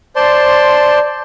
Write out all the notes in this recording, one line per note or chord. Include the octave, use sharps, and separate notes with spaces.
C5 D5 A5 C6